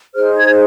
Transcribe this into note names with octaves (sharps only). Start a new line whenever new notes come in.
D#4 G#4 C5 F6
G#6